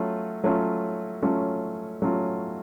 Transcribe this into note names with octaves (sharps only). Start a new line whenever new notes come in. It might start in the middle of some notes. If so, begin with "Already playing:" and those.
Already playing: F#3 A3 C#4 F4
F#3 A3 C#4 F4
F#3 A3 C#4 F4
F#3 A3 C#4 F4